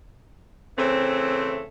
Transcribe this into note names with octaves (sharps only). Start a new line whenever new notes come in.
C#3 E3 A3 C4